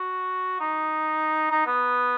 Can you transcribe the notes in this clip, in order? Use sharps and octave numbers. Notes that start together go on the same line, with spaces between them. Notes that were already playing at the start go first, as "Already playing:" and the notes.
Already playing: F#4
D#4
D#4
B3